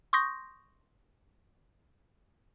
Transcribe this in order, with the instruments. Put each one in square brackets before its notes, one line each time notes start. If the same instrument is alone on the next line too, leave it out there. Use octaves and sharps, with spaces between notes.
[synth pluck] C6 C#6 D#6 G6 A#6